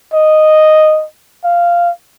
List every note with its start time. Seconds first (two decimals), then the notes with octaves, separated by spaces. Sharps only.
0.14 D#5
1.45 F5